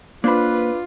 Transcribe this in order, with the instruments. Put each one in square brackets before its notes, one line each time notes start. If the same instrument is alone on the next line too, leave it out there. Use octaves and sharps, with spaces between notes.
[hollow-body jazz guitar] A#3 C5 B5 [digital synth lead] D4 [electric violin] F4 [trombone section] B4